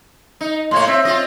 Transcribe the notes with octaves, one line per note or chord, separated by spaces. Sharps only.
D#4
A2 A#3 C#5 C6
C4 E5
C4 F4 D#5